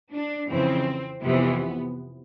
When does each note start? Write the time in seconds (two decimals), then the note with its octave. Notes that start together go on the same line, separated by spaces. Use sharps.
0.12 D4
0.48 F2 C#3 E3 C4
1.21 F2 C3 E3 B3